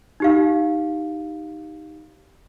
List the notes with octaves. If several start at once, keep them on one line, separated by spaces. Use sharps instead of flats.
D#4 G4 F5